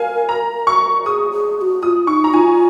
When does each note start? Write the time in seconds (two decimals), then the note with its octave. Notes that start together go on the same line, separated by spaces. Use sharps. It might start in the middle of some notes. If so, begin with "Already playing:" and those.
Already playing: A#4 F5 G#5
0.29 A#5
0.67 C#6
1.05 G#4 D#6
1.31 G#4
1.57 G#4
1.61 F#4
1.82 F4 D#6
2.07 D#4 C#6
2.24 A#5
2.33 F4 G#5